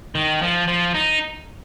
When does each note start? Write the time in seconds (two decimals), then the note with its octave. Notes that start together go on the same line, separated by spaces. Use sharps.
0.15 D#3
0.42 F3
0.68 F3
0.94 D#4